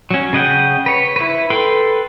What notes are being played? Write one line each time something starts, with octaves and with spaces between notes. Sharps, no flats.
F#3 C#4
C#3 D#5 F#5 G5
B4 C#5
E4 B4
A4 B4 G5 B5 C6